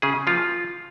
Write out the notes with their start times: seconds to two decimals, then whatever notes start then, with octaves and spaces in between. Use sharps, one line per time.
0.02 C#3 G#4
0.27 F3 A#3 F4